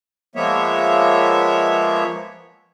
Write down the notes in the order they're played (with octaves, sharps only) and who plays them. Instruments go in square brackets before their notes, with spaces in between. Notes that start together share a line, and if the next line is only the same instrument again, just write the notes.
[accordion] F3 G#3 A#3 B3 C#5 E5